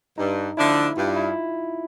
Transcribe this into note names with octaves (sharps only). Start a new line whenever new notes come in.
G2 D#4
D3 F3 A3 D4 E4
G2 F4
E4